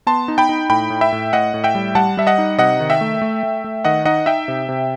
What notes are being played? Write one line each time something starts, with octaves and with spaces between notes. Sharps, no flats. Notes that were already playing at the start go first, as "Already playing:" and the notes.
B3 A5 C6
D#4
G5 B5
D#4
A2 G5 B5
A2
E5 G5
A2
A2 D#5 F#5
A2
E5 G5
G3
G3 F#5 A5
G3 E5
D#5 F#5
D#4
C3 D#5 F#5
D#3
E5 G5
A3
A3
A3
A3
D#3 D#5 F#5
D#4 D#5 F#5
D#4 E5 G5
C3
C3